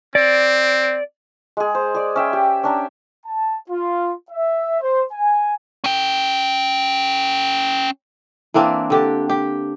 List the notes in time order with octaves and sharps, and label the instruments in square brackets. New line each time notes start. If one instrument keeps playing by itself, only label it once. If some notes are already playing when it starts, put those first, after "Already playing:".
[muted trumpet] C4 [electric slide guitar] D5
[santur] G#3 G#4
C5
G#4 D5
C#4 E5 G5
G4
C#4 D4 A#5
[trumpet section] A5
F4
E5
C5
G#5
[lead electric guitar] C#4 G5
[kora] E3 A#3 C4 D4
D3 G4 D5
G4